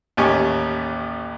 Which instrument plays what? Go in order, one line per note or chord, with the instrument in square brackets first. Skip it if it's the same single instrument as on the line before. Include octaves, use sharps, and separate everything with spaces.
[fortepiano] A1 D#2 C#4 G4 G#5 C#6